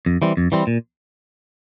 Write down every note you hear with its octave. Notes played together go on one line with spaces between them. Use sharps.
F2
E3 G3 C4
F2
E3 G3 C4
A#2